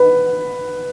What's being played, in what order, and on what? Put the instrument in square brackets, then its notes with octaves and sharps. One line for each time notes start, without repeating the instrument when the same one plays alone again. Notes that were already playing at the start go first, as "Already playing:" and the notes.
Already playing: [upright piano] B4